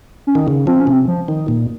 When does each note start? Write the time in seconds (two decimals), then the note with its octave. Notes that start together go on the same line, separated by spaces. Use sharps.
0.27 C#4
0.35 D#3
0.48 C#3
0.67 F3 C4
0.80 C#4
0.87 C3
0.93 C4
1.08 F3
1.28 D#3
1.48 A#2